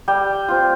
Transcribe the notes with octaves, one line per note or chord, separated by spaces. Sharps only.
G3 G5
C4 F4